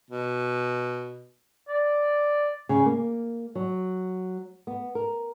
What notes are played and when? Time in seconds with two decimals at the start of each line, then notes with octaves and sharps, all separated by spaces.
0.11 B2
1.68 D5
2.69 C#3
2.86 A#3
3.55 F#3
4.67 B3
4.95 A#4